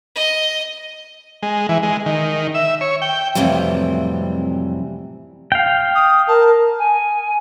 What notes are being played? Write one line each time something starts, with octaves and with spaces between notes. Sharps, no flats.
D#5
G#3
E3
G#3
D#3
E5
C#5
G5
F2 A2 C3 E3 F#3 G3
F5 G5
D#6
A#4 A5
G#5